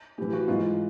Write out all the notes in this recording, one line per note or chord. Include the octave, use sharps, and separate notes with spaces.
A2 E3 G4
F#4
G#2 E3 F4
F4